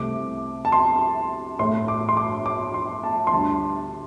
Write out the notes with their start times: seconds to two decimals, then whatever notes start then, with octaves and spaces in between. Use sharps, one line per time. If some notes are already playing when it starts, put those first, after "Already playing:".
Already playing: C2 C3 A3 D6
0.65 A5
0.72 C6
1.59 A2 A3 C6
1.88 D6
2.09 C6
2.17 D6
2.46 D6
2.74 C6
3.04 A5
3.27 C6
3.32 D2 D3 G3 A5